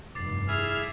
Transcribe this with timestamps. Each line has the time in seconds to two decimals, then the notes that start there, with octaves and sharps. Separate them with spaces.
0.15 F1 G2 D6 A6 C7
0.48 E4 G#4 E5 F6